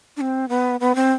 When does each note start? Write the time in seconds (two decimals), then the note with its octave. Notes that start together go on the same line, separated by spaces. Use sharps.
0.17 D4
0.21 C4
0.49 B3
0.80 B3
0.95 C4